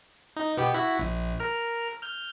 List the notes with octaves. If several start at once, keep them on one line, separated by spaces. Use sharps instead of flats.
D#4
B2 B3 G4
E4 F#4 B5
A#1
A#4 F6
F6 G6